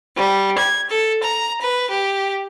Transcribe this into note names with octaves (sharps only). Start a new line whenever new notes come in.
G3
G#6
A4
A#5
B4
G4